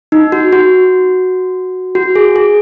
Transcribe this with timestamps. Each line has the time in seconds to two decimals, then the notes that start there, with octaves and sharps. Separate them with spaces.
0.12 D#4
0.32 F#4
0.53 F#4
1.95 F#4
2.16 G#4
2.36 G#4